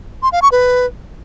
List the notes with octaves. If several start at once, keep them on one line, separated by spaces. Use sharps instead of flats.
C6
F5
C#6
B4